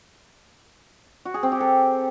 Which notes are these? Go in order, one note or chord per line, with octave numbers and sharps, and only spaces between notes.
F#4
G#4
C4
G4
A4